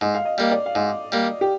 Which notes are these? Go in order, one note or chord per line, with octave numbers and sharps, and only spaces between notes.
G#2 D#5
F5
D#5
G3 A#3 D#5
D5
F5
G#2 D#5
G3 A#3
G4